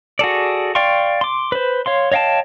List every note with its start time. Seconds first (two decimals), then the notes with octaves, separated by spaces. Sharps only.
0.19 F#4 G#4 A4 D5
0.75 D5 F5 G5 C6 C#6
1.21 C6 D6
1.52 B4 C5
1.86 C#5 F5 C6
2.12 C#5 D#5 F5 G5 A5